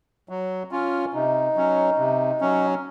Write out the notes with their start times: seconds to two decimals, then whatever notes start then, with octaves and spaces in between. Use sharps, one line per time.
0.29 F#3
0.71 C#4 F4
1.14 C3 D#4
1.56 F#3 C#4
1.98 C3
2.41 F#3 C#4